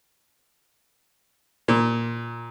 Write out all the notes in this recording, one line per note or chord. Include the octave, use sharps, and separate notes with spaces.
A#2